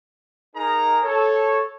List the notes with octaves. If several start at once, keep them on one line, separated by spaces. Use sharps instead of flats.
D#4 G#4 A#4 A#5
A4 C#5